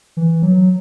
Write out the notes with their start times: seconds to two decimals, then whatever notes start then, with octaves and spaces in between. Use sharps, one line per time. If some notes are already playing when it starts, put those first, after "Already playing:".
0.17 E3
0.42 F#3